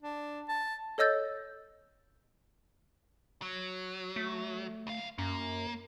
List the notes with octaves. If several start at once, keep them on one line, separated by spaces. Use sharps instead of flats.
D4
A5
A4 C#5 D#5 E6 G6 A6
F#3
A3
D2 F5
F#2 A#3